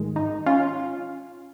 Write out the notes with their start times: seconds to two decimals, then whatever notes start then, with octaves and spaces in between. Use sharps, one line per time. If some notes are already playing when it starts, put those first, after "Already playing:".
Already playing: G#2 D#3 G#3
0.16 D#4
0.46 C#4 F4